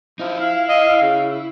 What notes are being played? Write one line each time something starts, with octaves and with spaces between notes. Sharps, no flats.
F3 D#4 E4
E4 F5
D#5
C#3